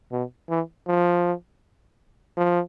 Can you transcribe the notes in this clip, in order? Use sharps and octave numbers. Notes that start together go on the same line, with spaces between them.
B2
E3
F3
F3